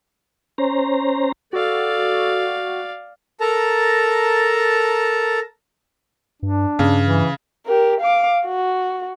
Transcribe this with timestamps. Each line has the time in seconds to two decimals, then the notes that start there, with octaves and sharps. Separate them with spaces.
0.58 C#4 C5 A#5
1.53 F#4 A4 D5 F5
3.41 A4 A#4 A5 A#5
6.43 G2 D4
6.79 G2 C#3
7.04 E3
7.66 G4 A#4
8.01 F5 D6
8.46 F#4